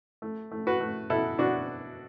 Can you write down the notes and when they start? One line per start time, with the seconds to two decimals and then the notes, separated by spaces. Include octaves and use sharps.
0.22 A3
0.51 A3
0.67 F#4 B4
0.80 A3
1.10 B2 E4 A4
1.38 B2 D4 F#4